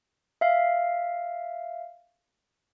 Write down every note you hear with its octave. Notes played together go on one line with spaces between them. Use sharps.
E5 F5